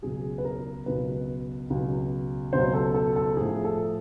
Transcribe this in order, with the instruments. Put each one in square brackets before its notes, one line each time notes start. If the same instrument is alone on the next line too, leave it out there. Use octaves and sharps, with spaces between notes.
[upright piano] C#2 B2 F#3 G#4
B4
A#4
C#2 B2 F#3 B4
C#2 B2 F#3
C#2 B2 F#3 C5
A4
A4
A4
A2 F3 G#4
A4